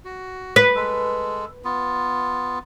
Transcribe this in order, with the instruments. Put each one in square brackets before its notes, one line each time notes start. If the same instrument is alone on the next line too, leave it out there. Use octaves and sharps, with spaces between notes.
[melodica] F#4
[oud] B4
[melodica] G#3 A4
B3 F4